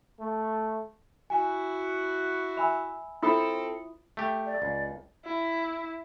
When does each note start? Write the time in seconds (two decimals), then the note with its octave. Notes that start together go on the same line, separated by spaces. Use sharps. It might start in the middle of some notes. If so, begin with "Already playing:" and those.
0.20 A3
1.30 E4 F#4 G#5
2.57 E5 G#5 B5 E6
3.22 C4 E4 F4 A4 E5 D#6
4.17 A3 G4
4.46 D5
4.62 C#2
5.25 E4